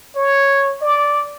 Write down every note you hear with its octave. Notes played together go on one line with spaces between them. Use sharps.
C#5
D5